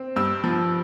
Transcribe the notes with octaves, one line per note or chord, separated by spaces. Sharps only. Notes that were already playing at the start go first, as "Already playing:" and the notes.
Already playing: C4
G2 E6
F3